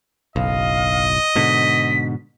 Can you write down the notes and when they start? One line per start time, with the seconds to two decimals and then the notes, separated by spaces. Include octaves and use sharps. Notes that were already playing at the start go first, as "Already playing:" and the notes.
0.36 F#1 B1 D#5 F5
1.35 G#2 B2 D3 B6